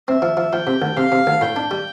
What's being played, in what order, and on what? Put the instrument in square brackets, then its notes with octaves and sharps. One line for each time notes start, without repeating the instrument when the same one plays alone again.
[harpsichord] C4 [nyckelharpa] E5
[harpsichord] F3
F3
[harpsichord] F3 [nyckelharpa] G5
[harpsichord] C3
D2
[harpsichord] C3 [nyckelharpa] F5
[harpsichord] C3
D2
[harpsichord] A2 [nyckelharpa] G5
[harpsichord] D4
G3